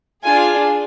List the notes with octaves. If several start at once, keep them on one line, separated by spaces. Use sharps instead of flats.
D4 F4 G#4 G#5